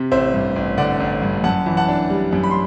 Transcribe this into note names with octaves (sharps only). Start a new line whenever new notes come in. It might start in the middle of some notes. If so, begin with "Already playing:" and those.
Already playing: C3
A1 C5 E5
G2
A1
D3 D5 F#5
A1
G2
F#2 F#5 A5
E3
F#5 A5
D4
G3
F#2
B5
C6